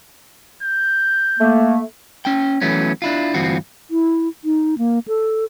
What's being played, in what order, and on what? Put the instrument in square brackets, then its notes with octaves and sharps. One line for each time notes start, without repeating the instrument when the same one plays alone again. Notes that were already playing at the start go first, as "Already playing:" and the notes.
[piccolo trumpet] G6
[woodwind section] A3 A#3
[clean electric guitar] C#4 G5
E3 F#3 A3 B3 C#4
D4 E4 F4
D2 G2 E3 C4 F4 F#4
[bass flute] E4
D#4
A#3
A4